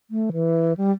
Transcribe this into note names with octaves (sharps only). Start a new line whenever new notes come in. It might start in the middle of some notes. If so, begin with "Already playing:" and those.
A3
E3
G3